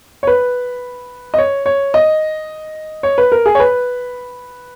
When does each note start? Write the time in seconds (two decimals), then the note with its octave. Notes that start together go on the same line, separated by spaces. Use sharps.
0.23 C#5
0.27 B4
1.34 D#5
1.38 C#5
1.66 C#5
1.94 D#5
3.03 C#5
3.18 B4
3.32 A#4
3.46 G#4
3.55 C#5
3.60 B4